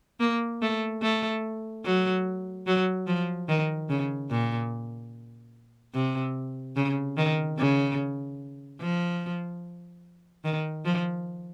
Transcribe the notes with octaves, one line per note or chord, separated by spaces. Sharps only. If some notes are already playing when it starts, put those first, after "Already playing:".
A#3
A3
A3
F#3
F#3
F3
D#3
C#3
A#2
C3
C#3
D#3
C#3
F3
D#3
F3